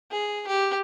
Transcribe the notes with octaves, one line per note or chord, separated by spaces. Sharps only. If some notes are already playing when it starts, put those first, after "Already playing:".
G#4
G4